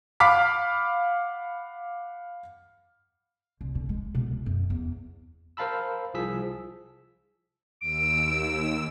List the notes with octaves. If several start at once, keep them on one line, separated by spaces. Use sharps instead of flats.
F5 F#5 B5 D6 F6 B6
C2
D3
G#3
B2
G#3
F#2
E2
A#4 C5 F5 A5 B5 E6
C2 F3 G#4 E6 B6
D#2 E6 D7